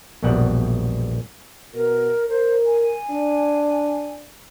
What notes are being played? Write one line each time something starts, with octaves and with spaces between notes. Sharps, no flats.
A#1 E2 B2 G3 F#5
B2 A#4
A#4 C5
G#5
D4